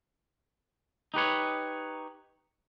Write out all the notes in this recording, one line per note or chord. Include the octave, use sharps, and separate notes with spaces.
D#4 G4 B4 C#5